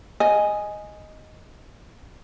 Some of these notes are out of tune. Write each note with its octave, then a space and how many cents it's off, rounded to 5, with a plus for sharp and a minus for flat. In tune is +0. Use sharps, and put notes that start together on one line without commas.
D#5 +0 G#5 +0